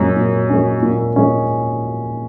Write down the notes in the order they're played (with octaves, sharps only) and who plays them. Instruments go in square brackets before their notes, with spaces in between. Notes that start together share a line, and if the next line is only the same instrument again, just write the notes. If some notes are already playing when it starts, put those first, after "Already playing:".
Already playing: [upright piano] F#2 [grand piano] A#2 G#3 C#4
[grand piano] A#2
G#3 C#4
A#2
G#3 C#4